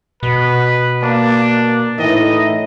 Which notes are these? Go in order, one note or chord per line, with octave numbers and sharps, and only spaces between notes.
B2 B4
A#3 D4
A2 E3 D#4 E4 D#5